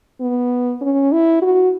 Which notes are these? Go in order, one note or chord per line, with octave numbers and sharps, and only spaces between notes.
B3
C#4
E4
F#4